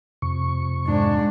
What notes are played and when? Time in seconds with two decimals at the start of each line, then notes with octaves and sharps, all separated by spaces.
0.22 F2 C3 C#6
0.87 G#2 D4